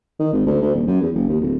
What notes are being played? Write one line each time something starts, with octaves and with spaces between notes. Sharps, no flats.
D#3
G#1
D2
D2
D#1
F#2
E2
F#1
D#2
D1